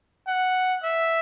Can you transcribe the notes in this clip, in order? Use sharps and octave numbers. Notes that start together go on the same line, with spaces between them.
F#5
E5